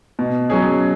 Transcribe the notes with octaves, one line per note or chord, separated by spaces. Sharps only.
B2
F#3 C#4 G#4